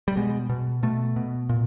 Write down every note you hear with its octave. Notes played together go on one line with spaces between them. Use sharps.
G3
B2 G#3
B2
B2 A3
B2
A#2